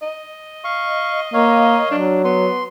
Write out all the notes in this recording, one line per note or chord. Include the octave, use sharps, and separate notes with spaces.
D#5
F5 C#6
A#3 C#5 F5
F#3 D4
B3 C6